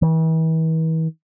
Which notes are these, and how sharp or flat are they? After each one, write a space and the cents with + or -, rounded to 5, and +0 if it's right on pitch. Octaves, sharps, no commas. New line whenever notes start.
E3 -40